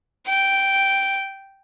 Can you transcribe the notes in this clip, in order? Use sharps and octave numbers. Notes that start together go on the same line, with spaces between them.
G5